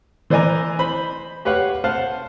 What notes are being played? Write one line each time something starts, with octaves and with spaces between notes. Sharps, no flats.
E3 C5 D5 D#5 G#5 A#5
C5 B5
G4 B4 C#5 F5 F#5
C5 F5 F#5 A5